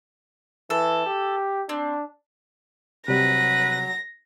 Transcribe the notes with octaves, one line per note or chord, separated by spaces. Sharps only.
E3 A4
G4
C4 D4
C3 F#3 G3 B4 A#6